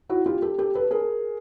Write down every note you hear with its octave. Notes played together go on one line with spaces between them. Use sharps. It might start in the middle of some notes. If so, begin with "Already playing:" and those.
E4 F#4
F4 G4
G4 A4
G4 A4
A4 B4
G#4 A#4